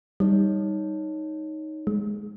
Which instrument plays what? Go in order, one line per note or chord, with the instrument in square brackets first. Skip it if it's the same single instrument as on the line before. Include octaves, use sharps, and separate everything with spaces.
[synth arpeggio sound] G3 [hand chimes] D#4 C#5
[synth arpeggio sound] G#3